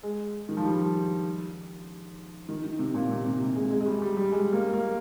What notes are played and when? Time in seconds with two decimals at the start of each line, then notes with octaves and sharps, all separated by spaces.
0.03 G#3
0.49 D#3
0.57 F3
0.64 G3
2.49 D#3
2.64 D#3
2.79 C3
2.94 A#2
3.09 C3
3.25 C3
3.40 C3
3.56 G#3
3.70 G#3
3.81 G#3
3.86 G3
4.02 G3
4.17 G3
4.32 G#3
4.53 A#3
4.73 A#3